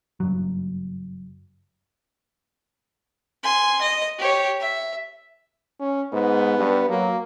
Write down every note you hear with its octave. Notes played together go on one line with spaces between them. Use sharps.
F#1 G2 F#3
G#5 C6
D#5
G4 C#5
E5
C#4
G#2 B3
G2
F#3 A#3